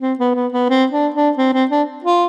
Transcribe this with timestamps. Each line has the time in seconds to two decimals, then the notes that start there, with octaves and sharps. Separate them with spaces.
0.02 C4
0.19 B3
0.35 B3
0.52 B3
0.69 C4
0.92 D4
1.14 D4
1.38 C4
1.53 C4
1.71 D4
2.04 F4